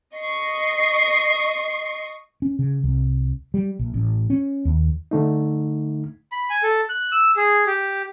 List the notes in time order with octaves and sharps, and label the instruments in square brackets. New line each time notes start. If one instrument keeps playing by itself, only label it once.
[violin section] D#5 C#6 C7
[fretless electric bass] C#4
C#3
C2
G3
A#1
A1
C#4
D#2
[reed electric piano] D3 A3 D#4
[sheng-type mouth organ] B5
G#5
A4
F#6
E6
G#4
G4